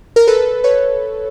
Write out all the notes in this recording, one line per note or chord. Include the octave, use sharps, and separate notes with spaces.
A#4
A4 B4
B4 C#5